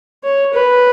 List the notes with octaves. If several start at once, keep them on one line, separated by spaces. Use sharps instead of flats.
C#5
B4